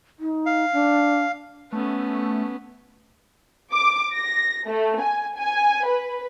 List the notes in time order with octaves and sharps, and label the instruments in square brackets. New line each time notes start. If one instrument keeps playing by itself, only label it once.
[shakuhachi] D#4
[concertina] F5
[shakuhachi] D4
[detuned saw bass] A3 [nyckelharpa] B3 C#4
[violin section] D6
A#6
A3
G#5
G#5
B4